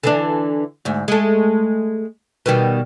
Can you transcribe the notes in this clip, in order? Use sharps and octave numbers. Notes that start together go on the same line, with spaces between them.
D3 E3 D4
D2 G#2
G#3 A3
B2 D#3 G3